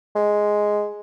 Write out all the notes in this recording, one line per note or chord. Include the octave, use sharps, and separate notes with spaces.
G#3